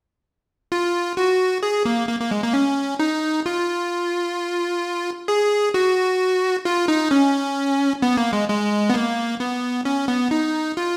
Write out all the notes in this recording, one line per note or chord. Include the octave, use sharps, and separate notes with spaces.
F4
F#4
G#4
A#3
A#3
A#3
G#3
A#3
C#4
D#4
F4
G#4
F#4
F4
D#4
C#4
B3
A#3
G#3
G#3
B3
A#3
B3
C#4
B3
D#4
F4